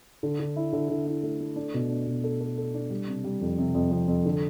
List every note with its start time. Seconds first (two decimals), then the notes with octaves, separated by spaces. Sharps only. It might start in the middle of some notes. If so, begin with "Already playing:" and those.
0.23 D3
0.40 D3
0.56 E4
0.73 D3
0.89 D3
1.07 E4
1.23 A3
1.40 A3
1.56 D4
1.74 B2
1.90 D4
2.06 B2
2.24 A4
2.41 A4
2.58 A4
2.74 D4
2.90 G3
3.08 C3
3.24 G3
3.41 F2
3.58 C3
3.75 F2
3.91 F2
4.08 F2
4.25 D3